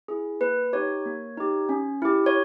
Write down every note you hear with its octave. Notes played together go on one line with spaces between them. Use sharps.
E4 G#4
A#3 B4
D#4 G4 C#5
A#3
D#4 G4
C#4
E4 G4
C#5